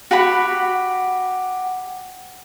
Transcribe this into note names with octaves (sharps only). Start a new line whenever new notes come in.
F#4 G4 F#5 B5